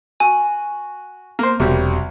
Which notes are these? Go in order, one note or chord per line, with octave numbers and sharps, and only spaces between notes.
F#4 G#5
A#3 C5
E1 C2 F#3 G3